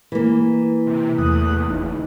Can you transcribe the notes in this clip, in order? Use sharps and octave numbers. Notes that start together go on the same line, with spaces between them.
E3 A#3
C3
E2 A3 D#6 F#6
F#1 D#4